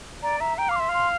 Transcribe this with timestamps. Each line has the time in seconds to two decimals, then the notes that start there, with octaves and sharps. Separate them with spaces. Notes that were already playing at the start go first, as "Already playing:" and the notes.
0.22 D5 A#5
0.40 E5 A#5
0.58 G5 A#5
0.69 F5 D6
0.76 E5 C6
0.89 F5
0.94 C6